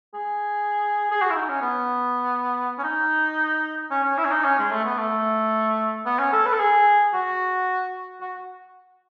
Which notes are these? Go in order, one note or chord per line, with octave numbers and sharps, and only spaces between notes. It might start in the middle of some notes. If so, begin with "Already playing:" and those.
G#4
G#4
F#4
E4
D#4
C#4
B3
C#4
D#4
C#4
C#4
E4
C#4
D#4
C#4
G#3
A3
B3
A3
B3
C#4
A4
B4
A4
G#4
F#4
F#4